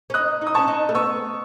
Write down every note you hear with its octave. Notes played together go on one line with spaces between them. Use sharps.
C#4
D#4 D#6 F#6
D#4
D#6
C#4 A5 C#6
D#4
A3
B3 C#6 E6